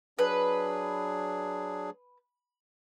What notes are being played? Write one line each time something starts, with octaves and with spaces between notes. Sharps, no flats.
F#3 D4 G#4 B4